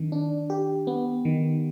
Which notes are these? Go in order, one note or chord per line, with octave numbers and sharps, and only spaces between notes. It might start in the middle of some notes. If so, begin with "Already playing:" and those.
Already playing: D#3 D4
D4
G4
B3
D#3